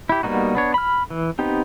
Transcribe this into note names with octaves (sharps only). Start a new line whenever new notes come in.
E4 G4
G3 A#3 B3 D#4 F#4
B3 D4 C#5
B5 F6
E3
B3 C4 D#4 G4